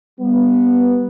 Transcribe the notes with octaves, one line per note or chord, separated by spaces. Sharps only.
G3 B3